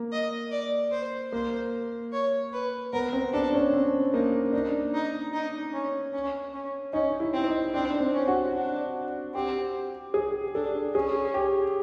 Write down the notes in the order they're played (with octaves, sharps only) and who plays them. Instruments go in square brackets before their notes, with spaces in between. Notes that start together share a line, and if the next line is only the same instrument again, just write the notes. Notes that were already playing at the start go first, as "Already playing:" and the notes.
Already playing: [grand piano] A#3
[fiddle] D#5
D5
C5
[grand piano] A#3 [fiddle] C5
[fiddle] C#5
B4
[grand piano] B3 [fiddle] A#4
[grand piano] C4
[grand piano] D4 [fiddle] A4
[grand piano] C#4
C4
[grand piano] A#3 [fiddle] D#4
[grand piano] D4 [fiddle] D#4
[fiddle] D#4
D#4
C#4
C#4
C#4
[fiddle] C#4 [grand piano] D#4
[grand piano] E4
[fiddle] C4
[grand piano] D#4
[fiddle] C4 [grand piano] D4
[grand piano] C4
[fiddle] C#4
[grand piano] F#4
[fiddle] D4
[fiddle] C4 [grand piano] G4
[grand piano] G#4
[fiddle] D4 [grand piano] A4
[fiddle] C#4 [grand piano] G#4
[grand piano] G4